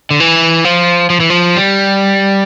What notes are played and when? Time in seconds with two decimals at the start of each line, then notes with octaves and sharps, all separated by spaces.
0.11 D3
0.20 E3
0.65 F3
1.10 F3
1.20 E3
1.30 F3
1.56 G3